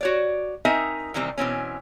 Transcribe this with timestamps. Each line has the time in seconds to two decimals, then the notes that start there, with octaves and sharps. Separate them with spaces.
0.01 F#4 C#5 D5
0.65 C4 D#4 A#4 D#5 E5 G#5
1.14 C3 D#3 E3 G3 C4
1.38 B2 E3 C4 C#4